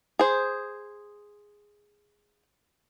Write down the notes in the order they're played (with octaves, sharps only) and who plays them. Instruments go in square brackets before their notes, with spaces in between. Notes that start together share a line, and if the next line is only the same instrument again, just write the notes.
[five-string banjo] G#4 C5